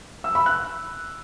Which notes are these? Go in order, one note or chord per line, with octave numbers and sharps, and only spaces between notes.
E6
B5
F#6